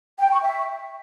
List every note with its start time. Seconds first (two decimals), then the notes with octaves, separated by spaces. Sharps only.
0.18 G5
0.30 C#6
0.42 E5